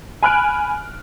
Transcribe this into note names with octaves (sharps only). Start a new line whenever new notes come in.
G#5 B5 F6 F#6 D7